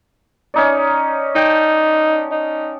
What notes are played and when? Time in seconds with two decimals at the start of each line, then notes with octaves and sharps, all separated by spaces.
0.54 C#4 D#4 D5
1.35 D#4 G5 A5
2.32 D#4